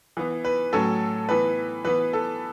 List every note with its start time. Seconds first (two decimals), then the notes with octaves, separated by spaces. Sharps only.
0.17 E3 B3
0.45 B4
0.73 A2 F#3 C#4 A4
1.29 E3 B3 B4
1.85 E3 B3 B4
2.13 A4